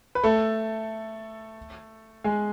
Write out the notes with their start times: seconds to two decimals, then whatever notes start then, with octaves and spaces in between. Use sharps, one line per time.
0.15 B4
0.23 A3 A4
2.24 G#3 G#4